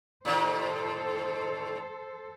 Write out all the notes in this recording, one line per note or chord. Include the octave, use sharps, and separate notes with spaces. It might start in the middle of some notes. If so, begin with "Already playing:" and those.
A2 C3 D#3 A4 C5